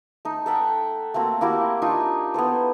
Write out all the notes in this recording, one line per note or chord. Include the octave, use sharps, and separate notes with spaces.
A3 D#4
A4 E5 F#5 G5
A3 A#3 C4 F#4
A#3 E4 F#4 G4
D4 D#4 F4 C#6
B3 E4 A4 C5